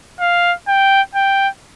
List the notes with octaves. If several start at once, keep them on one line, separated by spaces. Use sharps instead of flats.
F5
G5
G5